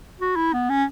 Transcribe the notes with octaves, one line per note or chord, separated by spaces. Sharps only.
F#4
E4
B3
C#4